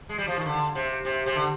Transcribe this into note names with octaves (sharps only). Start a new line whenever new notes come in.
G#3
G3
F3
D#3
D3
C3
C3
C3
D3